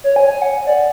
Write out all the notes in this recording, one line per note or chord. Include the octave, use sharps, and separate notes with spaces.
C#5
G#5
G#5
F#5
D5